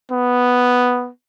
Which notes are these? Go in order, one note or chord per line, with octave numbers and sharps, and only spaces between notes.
B3